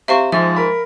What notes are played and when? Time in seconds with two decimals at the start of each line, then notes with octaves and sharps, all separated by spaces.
0.08 C3 E5 F5 C#6
0.32 G#2 F3 E5
0.56 A#4 B5